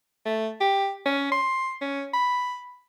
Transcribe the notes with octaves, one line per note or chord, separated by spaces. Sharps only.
A3
G4
C#4
C6
C#4
B5